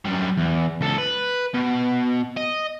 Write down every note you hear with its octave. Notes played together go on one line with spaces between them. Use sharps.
F#2 G3
E2
C#2 A4
B4
B2
D#5